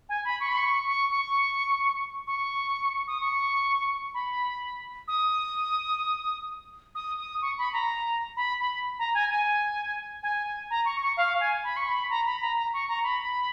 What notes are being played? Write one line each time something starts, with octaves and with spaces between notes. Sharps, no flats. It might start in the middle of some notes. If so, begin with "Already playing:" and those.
G#5
B5
C#6
B5
C#6
C#6
C#6
C#6
D#6
C#6
B5
D#6
D#6
D#6
C#6
B5
A#5
B5
B5
A#5
G#5
G#5
G#5
A#5
C#6
C#6
F5
G#5
B5
C#6
B5
A#5
B5
A#5
A#5
C#6
A#5
B5